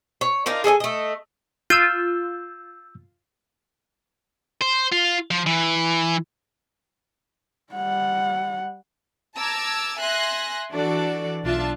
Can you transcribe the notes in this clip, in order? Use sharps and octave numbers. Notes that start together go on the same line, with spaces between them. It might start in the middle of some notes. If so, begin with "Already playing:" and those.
C#5
D4 D#4 F4 A#4
G#4 A4 D5 G#5
A3 D#5
F4 E6 G6
C5
F4
F3
E3
G3 F#5
A5 A#5 D6 E6 G#6
E5 G#5 C6 F#6 A#6
E3 D4 F#4 A4 D5
B1 D4 F4 E5 A5